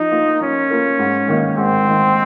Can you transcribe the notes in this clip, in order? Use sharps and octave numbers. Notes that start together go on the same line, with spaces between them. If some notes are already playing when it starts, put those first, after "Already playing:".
Already playing: F3 D#4
A#3 F4 A#4
F3 C#4
A#3 F4 A#4
G#2
D#3 A#3 D#4
G#2 C4
D#3 A#3 D#4